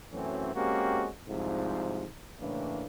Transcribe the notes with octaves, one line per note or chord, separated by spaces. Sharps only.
F#2 E3 F#3 A3 C4 C#4
G#3 A#3 C4 C#4 F#4 G4
C2 G#2 F3
A2 C#3 E3 A3 A#3 D4